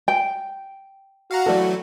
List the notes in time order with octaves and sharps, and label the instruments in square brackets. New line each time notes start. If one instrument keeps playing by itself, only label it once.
[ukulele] G5
[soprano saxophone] F#4 [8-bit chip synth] F5 F#5 A#5
[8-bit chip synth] E3 F#3 A3 [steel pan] A4 D5